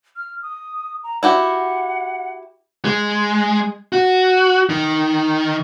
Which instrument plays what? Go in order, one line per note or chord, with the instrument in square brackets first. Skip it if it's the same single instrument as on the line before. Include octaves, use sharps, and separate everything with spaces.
[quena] F6
D#6
A#5
[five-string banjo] E4 F#4 G4 [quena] F#5
[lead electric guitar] G#3
F#4
D#3